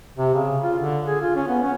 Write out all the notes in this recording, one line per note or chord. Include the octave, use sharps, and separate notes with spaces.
C3
C#3
F4
D3
G#4
F4
C#4
B3
C#4